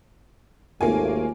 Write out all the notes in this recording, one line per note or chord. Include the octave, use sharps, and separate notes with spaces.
G#1 D#2 A3 A#3 F4 G#5